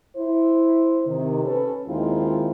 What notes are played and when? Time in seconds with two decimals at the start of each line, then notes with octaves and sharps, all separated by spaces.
0.16 E4 C5
1.06 C3 D#3
1.45 C#4 A4 B4
1.87 D#2 D#3 G#3 C4 E4 F4